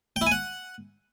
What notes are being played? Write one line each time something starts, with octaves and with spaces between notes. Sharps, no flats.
G5
E4
G#5
F#5